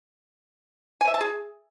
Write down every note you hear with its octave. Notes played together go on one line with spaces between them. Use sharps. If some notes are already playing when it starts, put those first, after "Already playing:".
G#5
E5
A5
G#4